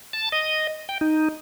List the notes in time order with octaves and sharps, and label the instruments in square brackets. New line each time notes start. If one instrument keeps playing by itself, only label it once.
[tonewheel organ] A5
D#5
G5
D#4